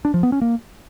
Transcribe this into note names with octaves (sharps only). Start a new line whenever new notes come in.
D4
F3
B3
C#4
A#3